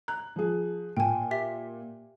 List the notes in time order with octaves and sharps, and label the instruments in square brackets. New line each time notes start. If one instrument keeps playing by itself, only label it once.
[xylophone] A#5 [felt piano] F#6
[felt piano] F3 G#4
[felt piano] A#2 [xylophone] G5 G#5
[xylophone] G4 E5 B6